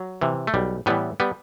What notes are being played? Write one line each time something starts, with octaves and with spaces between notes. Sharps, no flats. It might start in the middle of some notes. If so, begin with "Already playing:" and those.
Already playing: F#3
C3 E3
A3
B1 G3
A2 E3 G3 B3
G3 B3